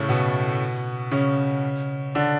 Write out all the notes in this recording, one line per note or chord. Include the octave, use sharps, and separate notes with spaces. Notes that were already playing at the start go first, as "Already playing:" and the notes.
Already playing: A2 C#3 A3 C#4
B2 B3
C#3 C#4
D3 D4